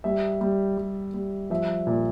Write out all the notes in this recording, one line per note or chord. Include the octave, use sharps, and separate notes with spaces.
G3 E5
G3
G3
G3
F3 E5
A#2